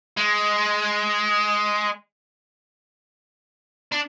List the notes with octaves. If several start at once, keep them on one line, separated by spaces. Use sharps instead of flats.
G#3
D4